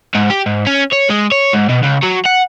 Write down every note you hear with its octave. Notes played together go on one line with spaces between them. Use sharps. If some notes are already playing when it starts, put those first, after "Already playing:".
G#2
G4
G#2
C#4
C#5
G#3
C#5
G#2
B2
C#2
F#3
F#5